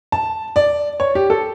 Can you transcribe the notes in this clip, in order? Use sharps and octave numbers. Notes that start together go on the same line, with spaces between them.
A5
D5
C#5
G4
A4